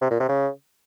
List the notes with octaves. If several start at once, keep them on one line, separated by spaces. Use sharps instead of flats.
C3
A#2
C3
C#3